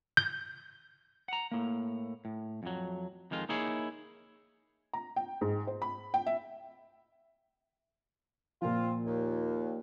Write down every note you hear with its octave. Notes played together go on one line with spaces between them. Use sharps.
G6
F#5 A#5
A2 A#3
A2
F2 F#3
F2 D#3 G#3 F4
A#3 D#4 E4 G#4 C#5
A#5
G5
G#2
C5
B5
G5
E5
A#2 F3 C4 F4
D#2